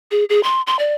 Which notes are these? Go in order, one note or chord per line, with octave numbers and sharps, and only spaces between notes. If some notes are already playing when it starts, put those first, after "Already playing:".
G#4
G#4
C6
C6
D5